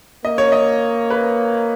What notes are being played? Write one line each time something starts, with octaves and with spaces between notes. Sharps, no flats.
A#3 D#5
C#5
D#5
B4